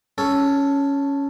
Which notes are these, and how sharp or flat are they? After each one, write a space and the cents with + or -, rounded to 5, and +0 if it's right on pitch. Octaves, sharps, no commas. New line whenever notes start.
C#4 +5 A4 +0